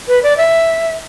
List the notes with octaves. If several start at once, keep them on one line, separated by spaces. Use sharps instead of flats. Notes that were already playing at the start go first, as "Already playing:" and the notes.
B4
D5
E5